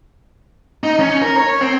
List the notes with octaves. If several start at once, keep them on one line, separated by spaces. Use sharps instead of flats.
D#4
C#4
A#4
C#5
C4